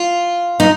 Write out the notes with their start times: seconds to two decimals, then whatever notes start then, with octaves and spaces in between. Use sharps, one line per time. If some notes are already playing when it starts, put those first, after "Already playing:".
Already playing: F4
0.60 D#4